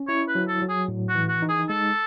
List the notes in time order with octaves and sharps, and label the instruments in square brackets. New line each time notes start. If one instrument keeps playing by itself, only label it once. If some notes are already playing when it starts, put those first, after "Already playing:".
Already playing: [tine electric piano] C#4
[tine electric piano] E4 [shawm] C#5
[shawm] B4
[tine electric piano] F#3
[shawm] A4
[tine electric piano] F#3
[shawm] G#4
[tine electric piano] A2
[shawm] F#4
[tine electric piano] E3
[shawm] F#4
[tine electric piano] D#4
[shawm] G#4
[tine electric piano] G#3 [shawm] A4